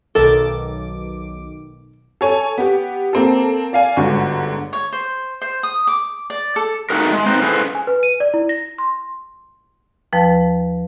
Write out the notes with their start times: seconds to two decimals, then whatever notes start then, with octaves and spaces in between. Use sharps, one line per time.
0.15 B1 D#3 A4 A#4 D6
2.21 A4 C#5 G#5
2.58 B3 G4
3.13 A#3 C4 A4
3.73 D5 F5 G#5
3.97 G1 G#2 D3 F#4 C#6
4.73 C#5
4.92 C5
5.42 C5
5.63 D#6
5.87 D6
6.30 D5
6.56 A4
6.90 A3 D#4 F#4 G#4 A#4
7.12 G#3
7.25 C4 D#4 B4 C5
7.43 C#4 E4 G#4 A4 B4 C5
7.75 G#5
7.87 B4
8.03 D#7
8.20 D5
8.34 E4
8.49 A#6
8.78 C6
10.13 D#2 F3 B4 A5